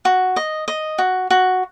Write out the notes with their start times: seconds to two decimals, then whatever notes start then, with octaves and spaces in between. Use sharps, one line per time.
0.05 F#4
0.36 D#5
0.68 D#5
0.98 F#4
1.30 F#4